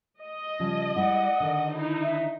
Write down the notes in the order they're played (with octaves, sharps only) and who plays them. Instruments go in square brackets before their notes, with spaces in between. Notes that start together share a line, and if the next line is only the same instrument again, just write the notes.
[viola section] D#5
[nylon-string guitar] C#3 F3 G3
[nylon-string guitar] G3 G#3 E4 [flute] F#5
[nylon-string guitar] D3 D#3
[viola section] D#4 E4
[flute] E5